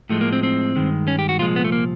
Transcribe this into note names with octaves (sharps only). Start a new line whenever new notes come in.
A2 F3 G#3 A3
A#3
C4
C4
G2 D#3 G#3
C#4
G4
F#4
C2 A#2 F3 G#3 F4
B3
A3
A#3